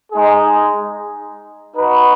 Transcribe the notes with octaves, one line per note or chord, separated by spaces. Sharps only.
G#3 D#4 G#4
D#4 F#4 B4